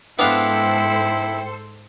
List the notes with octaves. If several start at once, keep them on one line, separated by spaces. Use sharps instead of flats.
G#2 B3 D4 E4 A4 C5 F5 G5